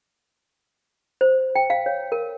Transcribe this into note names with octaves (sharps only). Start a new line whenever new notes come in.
C5
G5
F5
C#5
A#4